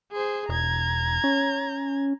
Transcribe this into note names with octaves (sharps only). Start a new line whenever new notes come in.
G#4 C5
E1 A#5 G#6
C#4